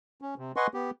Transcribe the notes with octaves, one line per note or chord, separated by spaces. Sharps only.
C#4
C3
B4 D#5 F#5 G#5 C6 C#6
B3 G4